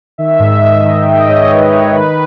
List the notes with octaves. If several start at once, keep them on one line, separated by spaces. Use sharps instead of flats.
D#3 E5
G#2
E5
G#2 D#5
D#3
G5
D#3 E5
D#5
G#2 C#5
G#2 B4
D#3 C#5
D#3 B4